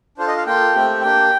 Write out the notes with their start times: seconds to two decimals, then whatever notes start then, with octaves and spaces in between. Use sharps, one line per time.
0.18 D4 F4 A4 C5
0.28 D#5
0.37 F5
0.47 A#3 F4 A4 G5
0.74 A3 C4 G4
1.02 A#3 D4 G4 G5